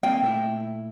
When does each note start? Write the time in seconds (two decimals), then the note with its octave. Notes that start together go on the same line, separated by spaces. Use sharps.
0.03 A#3 C4 D#4 G5
0.22 A#2 A3 E4